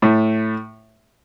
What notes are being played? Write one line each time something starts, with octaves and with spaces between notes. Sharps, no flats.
A2 A3